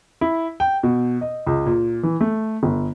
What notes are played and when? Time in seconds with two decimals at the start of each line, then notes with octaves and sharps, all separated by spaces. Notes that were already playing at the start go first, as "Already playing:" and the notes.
0.21 E4
0.60 G5
0.83 B2
1.21 D#5
1.47 C#2
1.66 A#2
2.03 E3
2.21 A3
2.63 G1